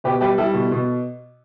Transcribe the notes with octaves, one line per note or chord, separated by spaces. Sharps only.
B2 G4 B4
G3 G4 B4
G3 E4 A4
B2
B2